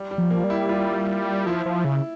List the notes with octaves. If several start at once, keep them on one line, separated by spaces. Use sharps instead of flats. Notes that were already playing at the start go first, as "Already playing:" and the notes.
Already playing: G3
G3
F3
A#3
G3
E4
F4
F3 E4
F3
C#3